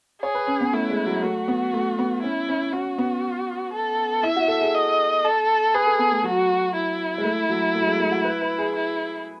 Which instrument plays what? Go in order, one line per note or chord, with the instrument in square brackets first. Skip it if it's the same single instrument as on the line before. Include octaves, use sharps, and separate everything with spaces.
[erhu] G#4 [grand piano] C#5
[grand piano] B4
C#4
B3
[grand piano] A3 [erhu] E4
[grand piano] G#3
F#3
[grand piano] A3 [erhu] F#4
[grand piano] B3
A3
B3
[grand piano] C#4 [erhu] E4
[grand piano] C#4
[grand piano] C#4 [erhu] F#4
[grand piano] B3
[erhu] A4
[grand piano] E4 [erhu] E5
[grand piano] F#4
A4
G#4
[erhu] D#5
A4
[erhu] G#4 [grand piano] B4
[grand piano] A4
B3
A3
[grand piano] F#3 [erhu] F#4
[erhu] E4
[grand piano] G#3
A3
F#3
A3
F#3
G#3
A3
F#4
B4
B4
G#4
[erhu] E4